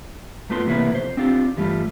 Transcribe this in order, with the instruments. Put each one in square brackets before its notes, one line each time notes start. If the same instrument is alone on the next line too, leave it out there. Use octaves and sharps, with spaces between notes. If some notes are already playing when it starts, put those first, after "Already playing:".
[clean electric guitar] F#2 A3 B3 F4 D5 C6
A2 C3 E3 A#3 B3 E4
C2 F2 C5
C4 D4 F4 G4
G2 E3 G3 A3 F4